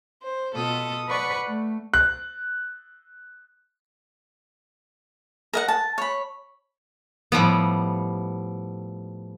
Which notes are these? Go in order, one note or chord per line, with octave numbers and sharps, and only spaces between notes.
C5
B2 B3 F4 A4 D#6
B4 D5 F#5 B5 C#6
A3
F#6
A#4 D#5 F#5
A5
C#5 B5
A2 F3 G3 B3